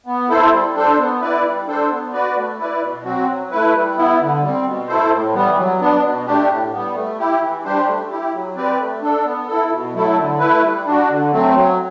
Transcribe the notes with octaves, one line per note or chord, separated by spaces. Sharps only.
B3
E4 A4 C5
G3
D4 A4 C5
B3
E4 B4 D5
G3
D4 A4 C5
B3
F#4 B4 D5
A3
E4 B4 D5
B2
F#3 C4 F#4
F#3
A3 E4 B4
G3
B3 E4
D3
G3
C4
B2
A3 E4 A4 C5
A2
E3 G3 B3
F#3
B3 D4
B2
A3 D4 G4
A2
G3 B3
A3
E4 G4
E3
G3 D4 G4 C5
A3
E4 G4
F#3
C4 G4 B4 D5
A3
D4 A4
B3
E4 A4
B2
F#3 A3 E4 A4
D3
A3 E4 B4
G3
D4 F#4
D3
F#3 A3 C4
F#3